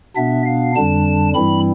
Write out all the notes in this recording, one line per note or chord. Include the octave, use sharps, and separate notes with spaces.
B2 B3 D4 E5
F5
F2 D3 G3 D4 A5
G2 E3 G3 C4 E4 B5